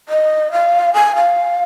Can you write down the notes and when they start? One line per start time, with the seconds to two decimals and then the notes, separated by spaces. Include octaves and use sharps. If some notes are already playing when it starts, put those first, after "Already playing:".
0.09 D#5
0.52 F5
0.93 G#5
1.16 F5